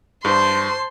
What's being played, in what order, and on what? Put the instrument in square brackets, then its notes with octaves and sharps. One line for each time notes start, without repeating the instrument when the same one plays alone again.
[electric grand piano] G2 [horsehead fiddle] C5 A5 [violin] C6